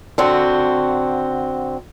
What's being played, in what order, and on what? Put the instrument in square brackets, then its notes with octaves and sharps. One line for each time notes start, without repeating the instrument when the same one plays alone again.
[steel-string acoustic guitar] D3 C4 F#4